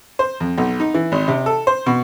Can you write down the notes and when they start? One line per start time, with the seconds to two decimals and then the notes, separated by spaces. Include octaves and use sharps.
0.19 C5
0.40 F2
0.58 B1
0.80 D#4
0.94 E3
1.12 G#1
1.28 C3
1.46 A4
1.67 C5
1.86 B2